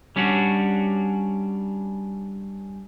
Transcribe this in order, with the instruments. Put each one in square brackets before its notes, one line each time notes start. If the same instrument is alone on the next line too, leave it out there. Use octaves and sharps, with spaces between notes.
[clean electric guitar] G3 C#4 D4 F#4